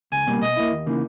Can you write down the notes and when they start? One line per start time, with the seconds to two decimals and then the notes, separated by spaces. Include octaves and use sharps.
0.12 C#2 G#5
0.27 B2 G3 A#3
0.41 B2 D#5
0.56 A#3 E4
0.72 D#2
0.86 C#3 E3 A#3 D#4